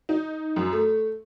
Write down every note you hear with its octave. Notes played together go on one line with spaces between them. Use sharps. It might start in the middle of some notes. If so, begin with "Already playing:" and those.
D#4
F#2
A3